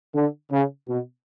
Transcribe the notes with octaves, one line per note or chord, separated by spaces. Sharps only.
D3
C#3
B2